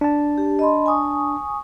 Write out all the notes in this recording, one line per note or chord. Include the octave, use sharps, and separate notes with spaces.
D4 A5
G4
D#5 B5 C6
G#5 C#6 D#6